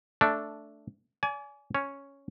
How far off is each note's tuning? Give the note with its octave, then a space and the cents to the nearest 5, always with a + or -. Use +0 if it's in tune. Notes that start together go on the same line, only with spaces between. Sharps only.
A3 +0 D4 -5
D5 -35 G#5 +20
C#4 +0 C#5 +0